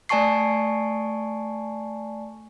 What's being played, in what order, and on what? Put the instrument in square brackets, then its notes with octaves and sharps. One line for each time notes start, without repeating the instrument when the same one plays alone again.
[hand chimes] A3 D5 G#5 A5 C#6 C7